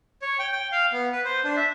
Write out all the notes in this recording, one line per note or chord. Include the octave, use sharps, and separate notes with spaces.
C#5
G5
G5
F5
B3
B4
C5
D4
E5